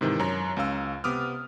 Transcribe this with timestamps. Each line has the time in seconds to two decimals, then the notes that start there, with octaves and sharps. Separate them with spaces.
0.01 G#2 C3 D#3 E3
0.20 F#2 C#5 A#5
0.57 C#2 C#4 F5 E6
1.04 C3 B3 D6 D#6 F6